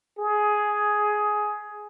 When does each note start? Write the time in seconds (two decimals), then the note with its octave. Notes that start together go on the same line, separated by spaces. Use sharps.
0.19 G#4